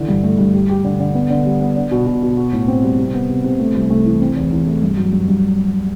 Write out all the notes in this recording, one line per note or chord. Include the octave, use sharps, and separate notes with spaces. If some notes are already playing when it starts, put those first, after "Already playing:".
Already playing: D3 E3
G2
A3
G2
G4
G4
D3
D3
B3
D3
G3
B3
D4
B2
B2
B2
F#4
A2
C4
G3
C3
B3
C3
C3
A3
C2
A3
E3
C4
E2
E2
A3
G2
F#3
G2
G2